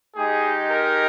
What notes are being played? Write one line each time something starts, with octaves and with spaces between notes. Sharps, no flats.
G#3 D#4 G4 G#4
A#4